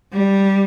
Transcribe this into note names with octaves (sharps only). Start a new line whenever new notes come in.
G3